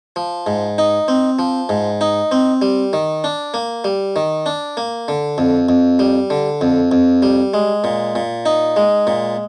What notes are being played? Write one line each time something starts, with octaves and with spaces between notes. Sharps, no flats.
F3
G#2
D#4
C4
F3
G#2
D#4
C4
G3
D#3
D4
A#3
G3
D#3
D4
A#3
D3
F2
F2
G3
D3
F2
F2
G3
G#3
A#2
A#2
D#4
G#3
A#2